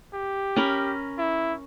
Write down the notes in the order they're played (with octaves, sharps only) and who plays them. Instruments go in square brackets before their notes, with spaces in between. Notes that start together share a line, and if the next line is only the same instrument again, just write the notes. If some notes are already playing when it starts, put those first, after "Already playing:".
[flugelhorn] G4
[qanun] C#4 A#4 B5
[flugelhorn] E4